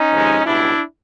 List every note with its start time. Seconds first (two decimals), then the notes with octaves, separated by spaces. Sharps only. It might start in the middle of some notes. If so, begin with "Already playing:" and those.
Already playing: C#4 D#4
0.11 F2 C3 D#3 G#3
0.45 C#2 B2 G3 D4 E4